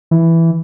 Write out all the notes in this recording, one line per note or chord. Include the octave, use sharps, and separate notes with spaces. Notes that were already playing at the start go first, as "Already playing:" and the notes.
E3